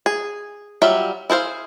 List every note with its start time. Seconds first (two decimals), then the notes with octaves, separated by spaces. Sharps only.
0.06 G#4
0.82 F#3 G3 F4 E5
1.30 E4 G#4 C5 F5